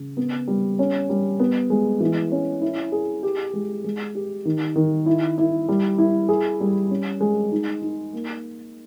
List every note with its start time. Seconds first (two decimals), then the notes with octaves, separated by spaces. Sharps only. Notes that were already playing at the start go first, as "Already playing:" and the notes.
Already playing: C#3
0.17 B3
0.47 G3
0.79 C#4
1.09 G3
1.39 B3
1.70 G#3
2.00 E3
2.32 C#4
2.62 E4
2.92 G#4
3.23 G4
3.53 G#3
3.84 G#3
4.15 G4
4.45 D#3
4.76 D#3
5.06 E4
5.38 E4
5.69 G3
5.98 E4
6.29 G#4
6.60 G3
6.91 C#4
7.20 G#3
7.52 D#4
7.82 D#4
8.13 A#3